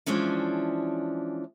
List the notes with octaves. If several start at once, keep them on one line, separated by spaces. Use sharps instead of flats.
E3 F3 G#3 C#4 D4